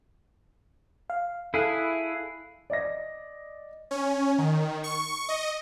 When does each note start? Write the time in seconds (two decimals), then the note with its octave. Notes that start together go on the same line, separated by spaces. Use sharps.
1.10 F5
1.54 E4 G#4 A4 F5 F#6
2.70 D5 D#5 A#6
3.91 C#4
4.38 D#3
4.84 C#6
5.29 D#5